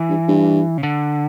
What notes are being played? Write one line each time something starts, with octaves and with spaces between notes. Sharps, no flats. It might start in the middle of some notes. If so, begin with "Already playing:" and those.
Already playing: E3
G2
G2
C#3
D3